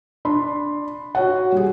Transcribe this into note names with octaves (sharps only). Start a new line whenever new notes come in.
D4 B5 C6
F#4 C#5 F#5
G3 G#4